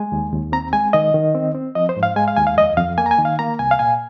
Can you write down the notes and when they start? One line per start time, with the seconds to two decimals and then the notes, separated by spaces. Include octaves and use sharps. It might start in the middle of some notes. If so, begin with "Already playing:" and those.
Already playing: G#3 G#5
0.12 D#2
0.32 D#2
0.52 C4 A#5
0.73 G#3 G#5
0.93 D#3 D#5
1.14 D#3
1.35 C4
1.55 C4
1.75 F3 D#5
1.89 C5
1.96 G#2
2.03 F5
2.16 G#3 G#5
2.28 F5
2.37 D#2 G#5
2.47 F5
2.57 F2 D#5
2.77 F2 F5
2.98 A#3 G#5
3.06 A#5
3.11 G#5
3.18 D#3
3.25 F5
3.39 A#3 A#5
3.59 C2 G#5
3.71 F5
3.79 A#2 G#5